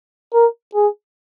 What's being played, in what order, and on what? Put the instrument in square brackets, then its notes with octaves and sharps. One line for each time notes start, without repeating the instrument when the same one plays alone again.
[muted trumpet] A#4
G#4